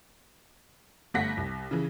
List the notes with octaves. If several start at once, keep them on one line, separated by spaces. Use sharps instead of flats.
G1 A3 F#5 A#6 B6
C2
C#3 E3